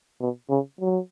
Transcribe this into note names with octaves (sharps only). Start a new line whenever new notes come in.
B2
C#3
F#3